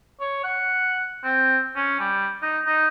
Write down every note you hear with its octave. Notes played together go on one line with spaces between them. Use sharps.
C#5
F#5
C4
C#4
G3
D#4
D#4